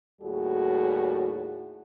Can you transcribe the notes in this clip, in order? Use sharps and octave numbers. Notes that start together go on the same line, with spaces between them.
D#2 A2 G3 F#4 G#4